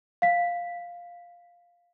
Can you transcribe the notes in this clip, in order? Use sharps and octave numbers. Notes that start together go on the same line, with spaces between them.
F5 B6